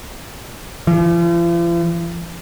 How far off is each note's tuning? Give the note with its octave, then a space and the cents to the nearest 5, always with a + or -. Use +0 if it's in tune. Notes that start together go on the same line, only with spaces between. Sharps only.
F3 -45